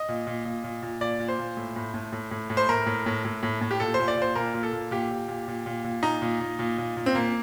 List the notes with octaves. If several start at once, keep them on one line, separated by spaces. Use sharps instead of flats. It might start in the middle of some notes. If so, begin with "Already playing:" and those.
Already playing: D#5
A#2
A#2
A#2
A#2
A#2
A#2 D5
A#2
C5
A#2
A2
A2
A2
A2
A2
A2
C5
A2 A#4
A2
A2
A2
A2
A2
G4
A#2 A4
A#2 C5
D5
A#2 C5
A#2 A#4
A#2
A4
A#2
A#2 G4
A#2
A#2
A#2
A#2
A#2
A#2 D#4
A#2
A#2
A#2
A#2
A#2
C4
A#2 A#3